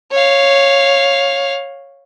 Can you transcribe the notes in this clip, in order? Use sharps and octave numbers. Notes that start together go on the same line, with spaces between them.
C#5 F5